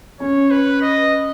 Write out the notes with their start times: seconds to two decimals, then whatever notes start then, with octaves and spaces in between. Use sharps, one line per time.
0.20 C#4 C#5
0.51 B4
0.82 D#5